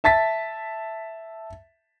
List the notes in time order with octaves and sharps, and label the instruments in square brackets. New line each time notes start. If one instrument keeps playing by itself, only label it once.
[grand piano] E5 A5 A6 B6